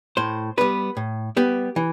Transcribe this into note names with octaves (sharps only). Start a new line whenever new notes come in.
A2 C5
G3 B3 B4
A2
G3 B3 G4
E3